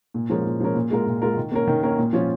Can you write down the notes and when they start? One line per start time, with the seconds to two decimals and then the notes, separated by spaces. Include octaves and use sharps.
0.14 A#2
0.30 F3 G#3 C#4 A#4
0.45 A#2
0.60 F3 G#3 C#4 A#4
0.75 A#2
0.91 G#3 F4 A#4
1.06 A#2
1.22 G#3 F4 A#4
1.37 D#3
1.52 A#3 C#4 A#4
1.67 D#3
1.83 A#3 C#4 A#4
1.98 A#2
2.13 F3 C#4 F4